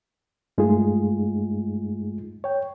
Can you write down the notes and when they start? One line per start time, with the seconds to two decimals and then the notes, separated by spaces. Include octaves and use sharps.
0.58 G2 G#3 A3 D#4 F4 G#4
2.44 C#5 G5